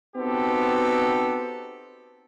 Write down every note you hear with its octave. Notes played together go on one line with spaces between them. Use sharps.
B3 C4 D#4 F#4 G4 A4